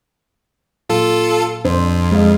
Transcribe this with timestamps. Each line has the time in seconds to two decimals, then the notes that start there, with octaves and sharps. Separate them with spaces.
0.89 A#2 F#3 F4 A4
1.65 F2 C4 D4 C5
2.12 G#3 D#5 F5